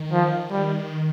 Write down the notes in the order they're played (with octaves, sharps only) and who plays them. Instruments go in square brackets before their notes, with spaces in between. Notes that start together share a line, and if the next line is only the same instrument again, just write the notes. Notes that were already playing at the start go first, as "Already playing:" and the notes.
Already playing: [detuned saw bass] D#3
[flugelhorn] F3
G3